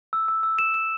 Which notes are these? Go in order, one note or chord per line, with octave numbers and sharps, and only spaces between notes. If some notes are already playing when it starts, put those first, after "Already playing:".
E6
E6
E6
E7
E7